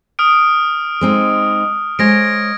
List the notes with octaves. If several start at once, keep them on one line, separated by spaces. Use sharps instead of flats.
D#6 F6 D7
G#3 C4 D#4
G#3 C5 C#5 G#6 A#6 D7